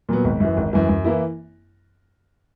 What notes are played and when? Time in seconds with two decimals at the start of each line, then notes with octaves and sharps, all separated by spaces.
0.09 A#2 F#3 B3
0.24 G#1
0.40 F#2 E3
0.57 G#1
0.73 F#2 E3
0.89 F#2
1.04 E3 A#3 E4